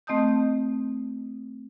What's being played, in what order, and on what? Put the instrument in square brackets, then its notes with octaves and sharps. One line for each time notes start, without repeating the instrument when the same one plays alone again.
[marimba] A3 C4 D#5 A5 D#6 G6